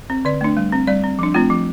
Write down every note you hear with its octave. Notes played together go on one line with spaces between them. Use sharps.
C4
D3 D5
A3 D4
G3
C4
G3 D5
C4
F3 D4
A3 C4 F4
F3